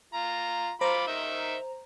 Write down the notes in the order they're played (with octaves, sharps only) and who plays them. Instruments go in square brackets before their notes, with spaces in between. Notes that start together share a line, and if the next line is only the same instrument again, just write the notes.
[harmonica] F4 A#5
[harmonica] F4 B5 D6 [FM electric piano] C5 A#5
[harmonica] D#3 D#4 E5